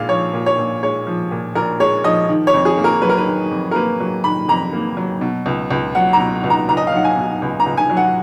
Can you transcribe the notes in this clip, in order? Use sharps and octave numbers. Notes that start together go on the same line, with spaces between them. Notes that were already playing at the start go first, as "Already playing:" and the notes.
Already playing: A#1 A#2 G#3 F5
F3 C#5
A#2
C#5
A#1
G#3 C#5
F3
A#2
A#1 A#4
G#3 C#5
F3 D#5
D#3
C#5
F2
G#4
A#3
A#4
F#3 B4
A#4
B4
D#3
F2
A#4
A#3 B4
F#3
D#3 B5
F2 A#5
A#3
F#3
B2
C#2
C#2
F#3 F#5
A#5
B2
C#2
A#5
C#2 A#5
D#5
F5
F#3 F#5
G#5
B2
C#2
A#5
C#2
G#5
F#3
F#5